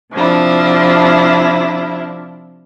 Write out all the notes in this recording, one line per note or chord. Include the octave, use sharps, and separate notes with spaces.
C3 F3 D4 E4